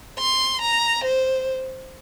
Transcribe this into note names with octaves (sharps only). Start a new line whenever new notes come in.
C6
A#5
C5